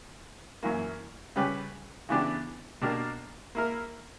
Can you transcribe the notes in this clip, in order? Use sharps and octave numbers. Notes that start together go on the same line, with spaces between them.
F#2 E3 A#3
C#3 G3 C#4 G4 B4
C#3 E3 B3 D4 G4
B2 A#3 D4 G4 A#4
A#3 E4 A#4